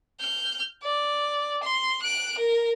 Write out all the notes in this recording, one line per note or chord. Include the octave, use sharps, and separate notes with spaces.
F6 G6
D5
C6
F#6 D7
A#4